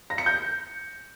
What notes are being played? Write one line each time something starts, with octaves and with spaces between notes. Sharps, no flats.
A#6
C#7
G6